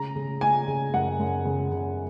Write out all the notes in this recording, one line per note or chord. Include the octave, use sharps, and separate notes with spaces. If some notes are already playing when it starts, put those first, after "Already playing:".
Already playing: C#3 A#5
C#3
C#3 G#5
C#3
F#2 F#5
F#2
C#3
C#3